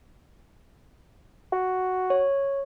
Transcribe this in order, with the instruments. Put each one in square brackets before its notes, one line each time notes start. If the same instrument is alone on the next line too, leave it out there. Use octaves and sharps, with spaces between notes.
[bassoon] F#4
[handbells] C#5